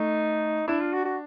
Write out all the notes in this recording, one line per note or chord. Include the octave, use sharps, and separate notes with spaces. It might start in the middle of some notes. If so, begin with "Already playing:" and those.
Already playing: A3 D#4
D4 E4
F4
F#4
F#4